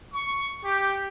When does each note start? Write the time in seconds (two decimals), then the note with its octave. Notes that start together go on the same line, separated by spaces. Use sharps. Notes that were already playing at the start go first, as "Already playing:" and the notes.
0.14 C#6
0.65 G4